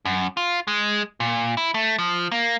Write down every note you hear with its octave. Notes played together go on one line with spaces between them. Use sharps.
F#2
F4
G#3
A#2
E4
A3
F3
A#3